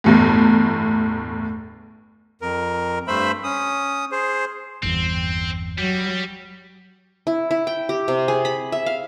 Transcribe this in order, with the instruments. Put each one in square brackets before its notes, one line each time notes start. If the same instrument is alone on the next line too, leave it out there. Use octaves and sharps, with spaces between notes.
[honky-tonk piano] G1 E2 A2
[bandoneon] F2 A#4
G2 A3 C5 E5 B5
C#4 D#6
G#4 C5
[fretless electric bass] G1 E2 [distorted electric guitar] C4
[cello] F#3 [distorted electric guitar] G3
[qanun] E4
E4
G5
G4
C3
G#4
B5
E5
F5